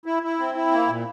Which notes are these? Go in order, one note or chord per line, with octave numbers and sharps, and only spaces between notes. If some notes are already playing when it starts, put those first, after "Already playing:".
E4
E4
C4
E4
A#3
A#2